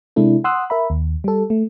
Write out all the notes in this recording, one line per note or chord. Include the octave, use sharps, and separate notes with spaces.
C3 G#3 D4 E4 A4
F#5 C6 D#6 E6 F#6
A#4 E5 B5
D#2
G3 A4
A3